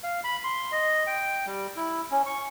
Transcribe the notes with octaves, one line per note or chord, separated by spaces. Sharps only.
F5
B5
C6
D#5
G5
G3
E4
C#4
C#6